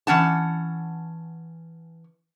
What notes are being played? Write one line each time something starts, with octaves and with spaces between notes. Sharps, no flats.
E3 C#4 F#5 A5